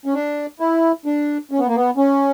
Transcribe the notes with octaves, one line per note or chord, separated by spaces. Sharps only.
C#4
D4
E4
D4
C#4
B3
A#3
B3
C#4